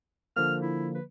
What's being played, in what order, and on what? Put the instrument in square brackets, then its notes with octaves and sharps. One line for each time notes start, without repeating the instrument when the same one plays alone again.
[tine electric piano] D3 F3 A#3 [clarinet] F6
[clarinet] E4
B4